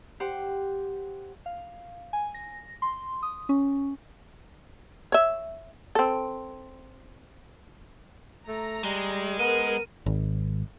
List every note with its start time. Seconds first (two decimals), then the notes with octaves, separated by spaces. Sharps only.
0.20 G4 C5 F#5 C6
1.46 F5
2.13 G#5
2.34 A#6
2.82 C6
3.23 D#6
3.49 C#4
5.12 C#5 E5
5.95 C4 A4
8.48 A3 A#5
8.84 G3 G#3
9.39 B3 A#4 D#7
10.06 G#1